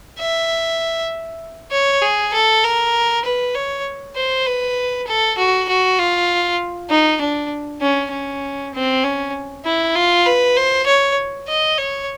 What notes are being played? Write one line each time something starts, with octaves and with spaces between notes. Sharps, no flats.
E5
C#5
G#4
A4
A#4
B4
C#5
C5
B4
A4
F#4
F#4
F4
D#4
D4
C#4
C#4
C4
C#4
E4
F4
B4
C5
C#5
D#5
C#5